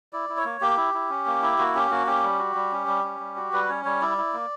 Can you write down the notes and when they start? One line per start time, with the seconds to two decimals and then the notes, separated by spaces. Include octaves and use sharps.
0.13 E4 D5
0.29 E4
0.37 C#5
0.45 A#3
0.61 A#3 G4
0.77 E4
0.94 E4
1.10 C#4
1.26 A#3
1.42 E4
1.59 A#3 F#4
1.75 C#4 G4
1.91 A#3 F#4
2.07 C#4 G4
2.23 G3
2.39 F#4
2.56 G3
2.72 C#4
2.87 G3
3.04 C#4
3.20 G3
3.36 F#4
3.53 G3 B4
3.69 C#4 C#5
3.85 G3 C#5
4.01 E4 D5
4.18 E4
4.33 A#3